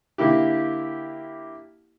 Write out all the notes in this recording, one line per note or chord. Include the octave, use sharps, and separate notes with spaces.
D3 A#3 E4 G4